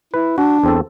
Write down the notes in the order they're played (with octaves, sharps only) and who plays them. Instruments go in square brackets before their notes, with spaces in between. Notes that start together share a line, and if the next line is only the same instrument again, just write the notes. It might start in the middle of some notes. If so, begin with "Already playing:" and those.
[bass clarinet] E4 [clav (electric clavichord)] B4
[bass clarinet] D4 [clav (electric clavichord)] F#4
[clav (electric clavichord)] E2 C4 A4